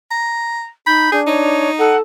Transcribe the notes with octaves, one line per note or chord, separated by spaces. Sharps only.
A#5
D#4 B5 G6
D4 G#4
D#4 C#5
A4 F#5